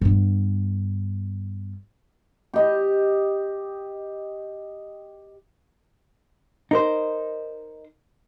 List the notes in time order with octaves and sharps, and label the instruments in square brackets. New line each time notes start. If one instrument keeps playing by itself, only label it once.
[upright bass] G2 B3
[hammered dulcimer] G4 D#5
[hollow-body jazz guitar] D#4 A#4 C5